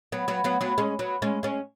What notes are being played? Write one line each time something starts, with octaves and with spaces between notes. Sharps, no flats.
F#3 B3
F#3 B3
F#3 B3
F#3 B3
G#3 C#4
F#3 B3
G#3 C#4
G#3 C#4